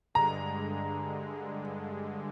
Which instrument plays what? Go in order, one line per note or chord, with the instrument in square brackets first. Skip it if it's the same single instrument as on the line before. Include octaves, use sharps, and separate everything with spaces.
[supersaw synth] G2 D3 G#3 [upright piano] A#5